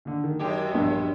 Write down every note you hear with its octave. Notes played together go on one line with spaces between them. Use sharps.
D#2 D3
D#3
F#2 G#3 G4
A#1 G2 B2